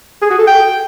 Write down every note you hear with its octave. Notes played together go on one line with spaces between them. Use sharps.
G#4
F#4
A4
G5